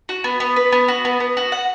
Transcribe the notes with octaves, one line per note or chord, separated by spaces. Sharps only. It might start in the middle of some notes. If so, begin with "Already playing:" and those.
F#4
B3
B3
B4
B3
F#4
B3
B3
F#4
F#5